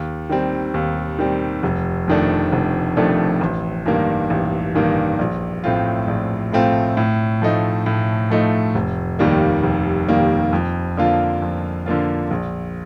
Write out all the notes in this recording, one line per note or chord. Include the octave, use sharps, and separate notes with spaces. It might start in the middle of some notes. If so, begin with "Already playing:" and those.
Already playing: D#2
D#3 G3 C4
D#2
D#3 G3 C4
F1
F2 D#3 A3 D4
F1
F2 D#3 A3 D4
A1
G2 D#3 A#3
A1
G2 D#3 A#3
A#1
A2 A3 C4 F4
A#1
A2 A3 C4 F4
A2
F3 A3 D#4
A2
F3 A3 D#4
F1
D#2 D#3 G3 A#3
F1
D#2 D#3 G3 A#3
F2
D3 F3 A#3 F4
F2
D3 F3 A#3 F4
A#1